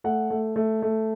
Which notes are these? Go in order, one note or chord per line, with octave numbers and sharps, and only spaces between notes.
A3 F#5
A3
A3
A3